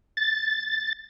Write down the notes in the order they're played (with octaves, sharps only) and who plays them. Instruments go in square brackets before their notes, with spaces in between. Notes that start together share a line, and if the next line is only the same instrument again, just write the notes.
[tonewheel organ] A6